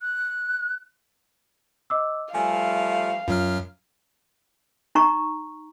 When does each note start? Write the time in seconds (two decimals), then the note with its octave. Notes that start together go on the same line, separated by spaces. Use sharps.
0.01 F#6
1.90 D#5 D6 E6
2.35 F3 G3 A3 F5 G#5
3.28 F#2 F#3 F4 F6
4.95 D#4 A#5 C#6